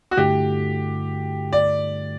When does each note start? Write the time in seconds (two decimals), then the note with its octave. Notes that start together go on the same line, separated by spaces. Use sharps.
0.11 F#4
0.16 G2 D3 A3 E4 G4
1.53 D5